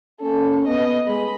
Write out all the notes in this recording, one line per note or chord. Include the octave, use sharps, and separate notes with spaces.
A#3 C#4 A4
B3 D#5
G#3 B5